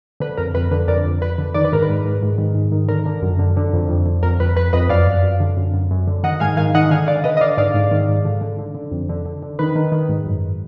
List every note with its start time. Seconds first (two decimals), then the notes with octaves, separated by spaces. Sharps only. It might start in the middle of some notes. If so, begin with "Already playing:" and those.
0.20 D3 B4
0.37 F2 A#4
0.54 F2 B4
0.71 D3 B4
0.88 F2 A#4 D5
1.05 F2
1.22 F2 B4
1.38 D3
1.54 D#3 D5
1.65 B4
1.72 G#2 A#4
1.82 B4
1.89 G#2
2.05 G#2
2.23 G#2
2.38 D#3
2.55 G#2
2.72 D#3
2.88 D3 A#4
3.06 D3
3.22 F#2
3.39 D3
3.57 D3
3.73 F2
3.89 F2
4.06 D3
4.23 F2 A#4
4.40 F2 B4
4.56 F2 B4
4.73 F2 B4 D#5
4.89 F#2 D5 F5
5.07 F#2
5.23 F#2
5.40 D3
5.57 F#2
5.74 F#2
5.91 F#2
6.07 D3
6.23 D#3 D#5 F#5
6.40 G#2 F5 G#5
6.57 D#3 F5 G#5
6.75 D#3 D#5 F#5
6.91 D3 F5 G#5
7.08 D3 D5 F5
7.24 D3 B4 D#5
7.37 D#5
7.41 D3 D5 F5
7.57 G#2 D5 F5
7.74 G#2
7.91 D#3
8.09 G#2
8.25 D3
8.41 D3
8.58 D3
8.75 D3
8.91 F2
9.09 D3
9.26 D3
9.43 D3
9.59 D#3 B4
9.76 D#3
9.92 D#3
10.09 G#2
10.26 F#2